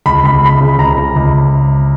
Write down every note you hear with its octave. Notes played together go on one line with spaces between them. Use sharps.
C#2 B5
C#2 B5
C#2 B5
C#3
C#2 A#5
C#3
C#2